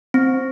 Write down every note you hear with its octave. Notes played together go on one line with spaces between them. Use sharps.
C4